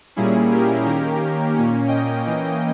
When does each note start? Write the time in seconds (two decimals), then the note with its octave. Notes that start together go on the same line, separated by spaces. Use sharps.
0.16 A#2 G3 A#3 C#4 E4 G#4
0.51 G4 A#4
0.84 D#3 A#3 C#4 G4 A#4
1.54 A#2 A#3 C#4
1.88 D#5 G5
2.22 E3 A#3 C#4